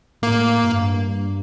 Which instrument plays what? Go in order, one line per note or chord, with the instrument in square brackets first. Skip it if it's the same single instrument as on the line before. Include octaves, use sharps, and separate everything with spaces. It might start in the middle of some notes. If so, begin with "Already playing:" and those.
[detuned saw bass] A2 [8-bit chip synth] A#3
[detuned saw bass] G2